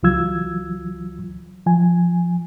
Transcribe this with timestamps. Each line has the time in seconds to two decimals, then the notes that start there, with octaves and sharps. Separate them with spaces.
0.03 C#2 E3 F#3 F4 E6 G#6
1.66 F3 G#5